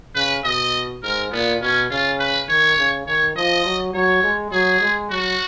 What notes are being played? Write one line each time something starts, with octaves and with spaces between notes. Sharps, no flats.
C#3 B4
B2 D#5
G#2 A#4
A#2 B3
B2 C#4
C#3 F4
B4
D#3 C#5
C#3
D#3 C#5
F3 D#5
F#3
F#3 C#5
G#3
F#3 G#4
G#3
F#3 F#4